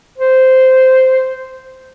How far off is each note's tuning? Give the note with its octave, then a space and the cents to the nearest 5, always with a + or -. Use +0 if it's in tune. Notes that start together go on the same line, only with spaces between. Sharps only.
C5 -10